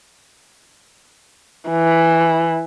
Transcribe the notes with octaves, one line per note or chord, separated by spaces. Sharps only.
E3